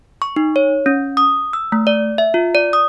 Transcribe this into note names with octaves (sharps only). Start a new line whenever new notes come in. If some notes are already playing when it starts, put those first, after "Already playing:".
C#6
D#4
C#5
C#4
D#6
E6
A3
D5
E5
F4
D5
D#6